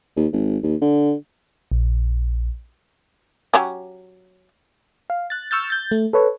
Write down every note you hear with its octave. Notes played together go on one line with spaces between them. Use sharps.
D#2
G#1
D#2
D3
A#1
F#3 C#4 G4
F5
F#6 A6
C#6 E6 F6 G6 A6
G6 A6
A3
A4 B4 C#5